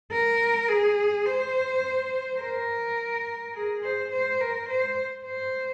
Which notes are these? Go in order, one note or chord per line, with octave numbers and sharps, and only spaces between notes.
A#4
G#4
C5
A#4
G#4
C5
C5
A#4
C5
C5